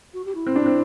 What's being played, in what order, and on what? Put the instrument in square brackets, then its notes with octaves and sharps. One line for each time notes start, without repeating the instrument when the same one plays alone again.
[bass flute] F#4
G4
E4
[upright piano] C4
D4
C4